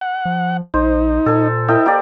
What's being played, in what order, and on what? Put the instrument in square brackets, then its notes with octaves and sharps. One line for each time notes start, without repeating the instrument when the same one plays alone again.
[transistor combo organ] F#5
[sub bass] F3
[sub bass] A#1 [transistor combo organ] D#4 [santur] C5
[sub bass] A#2 [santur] A4 G#5
[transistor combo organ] E4 [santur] A4 D#5 G5
[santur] A#3 G4 D5